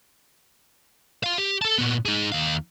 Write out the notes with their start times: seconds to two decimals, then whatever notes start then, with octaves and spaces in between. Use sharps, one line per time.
1.23 F4 F5
1.38 G4
1.62 A4 A5
1.78 A#2 B3
2.05 D#4 G#4
2.32 D#2 F5